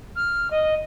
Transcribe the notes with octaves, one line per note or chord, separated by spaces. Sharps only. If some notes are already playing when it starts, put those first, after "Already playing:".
F6
D#5